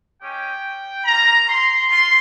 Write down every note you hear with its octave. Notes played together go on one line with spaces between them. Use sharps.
G#3 C#4 G4 G5
G3 A#3 F4 A#5
C6
F4 C6